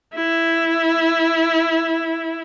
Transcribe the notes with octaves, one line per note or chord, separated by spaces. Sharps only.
E4